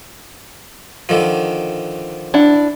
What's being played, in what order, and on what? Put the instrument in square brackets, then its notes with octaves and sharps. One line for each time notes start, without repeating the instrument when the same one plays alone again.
[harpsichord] D3 D#3 F3
[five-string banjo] D4 E4 F#5